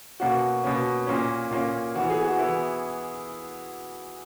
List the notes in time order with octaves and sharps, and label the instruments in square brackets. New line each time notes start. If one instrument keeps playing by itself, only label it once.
[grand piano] B2 A#3 C#4 F#4
B2 A#3 C#4
A#2 A#3 C#4
A#2 A#3 C#4
E3 B3 F#4
G#4
F#4
E3 B3 E4